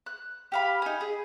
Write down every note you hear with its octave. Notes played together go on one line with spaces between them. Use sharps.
F#6
G4 F5 B5
D#4 G#5
G#4